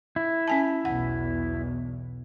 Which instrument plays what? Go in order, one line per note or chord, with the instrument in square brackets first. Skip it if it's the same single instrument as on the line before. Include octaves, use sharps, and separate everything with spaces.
[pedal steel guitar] E4
[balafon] C#4 G#5 A5
[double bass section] B1 E2 [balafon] F#5